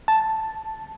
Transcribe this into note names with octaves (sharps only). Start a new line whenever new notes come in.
A5